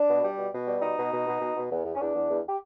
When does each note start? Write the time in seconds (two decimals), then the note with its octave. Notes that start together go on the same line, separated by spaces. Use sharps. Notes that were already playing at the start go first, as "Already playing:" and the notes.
Already playing: D4
0.09 B2
0.24 G3
0.38 B2
0.53 B2
0.68 G3
0.82 B2 D#4
0.97 B2
1.12 B2
1.27 B2
1.41 B2
1.56 B2
1.71 E2
1.85 E2
1.95 C#4
2.00 E2 D4
2.15 E2
2.30 E2
2.49 G4